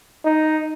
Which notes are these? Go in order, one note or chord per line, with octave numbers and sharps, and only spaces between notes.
D#4